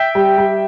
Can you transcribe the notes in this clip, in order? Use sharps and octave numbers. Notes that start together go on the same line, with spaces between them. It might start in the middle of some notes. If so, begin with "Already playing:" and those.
Already playing: E5 G5
G3
G3